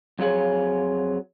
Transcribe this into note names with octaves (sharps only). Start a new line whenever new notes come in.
F2 F#3 F4 G#4 C#5